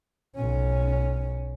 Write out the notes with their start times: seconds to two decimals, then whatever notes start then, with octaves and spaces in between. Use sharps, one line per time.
0.36 B1 C#4